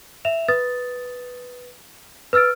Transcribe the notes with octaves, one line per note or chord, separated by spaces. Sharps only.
E5 E7 F7
B4 D#6 A6
B4 E6 F6 A6 D7